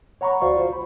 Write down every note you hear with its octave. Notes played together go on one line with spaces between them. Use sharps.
C#5 F#5 A#5 B5 C#6
D2 F#4 C5 D5 F5 C#6
F4 C5
C#2 B5